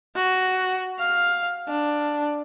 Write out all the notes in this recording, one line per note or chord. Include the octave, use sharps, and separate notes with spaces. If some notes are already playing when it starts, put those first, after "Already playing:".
F#4
F5
D4